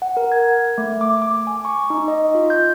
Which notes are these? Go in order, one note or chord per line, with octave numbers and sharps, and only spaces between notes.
F#5
A#4
G#6
A3
D6
D6
G#5
C#6
D#4
D#5
F4
G6